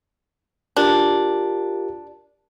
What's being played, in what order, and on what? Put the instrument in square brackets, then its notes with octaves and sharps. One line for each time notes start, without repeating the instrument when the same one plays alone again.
[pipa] D4 [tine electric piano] F4 G4 A#4